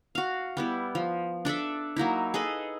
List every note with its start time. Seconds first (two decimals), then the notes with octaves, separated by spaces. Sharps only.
0.15 F#4 F5
0.57 G3 B3 E4
0.95 F3
1.45 D4 A4 D5 E5
1.96 F#3 A#3 D#4 E4
2.34 G#4 A4 B4 D#5